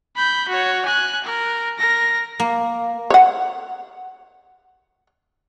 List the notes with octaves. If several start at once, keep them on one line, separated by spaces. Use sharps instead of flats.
B5 G6
F#4 C#5
G#5 F#6
A#4
A#4 A#6
A#3
C#5 F#5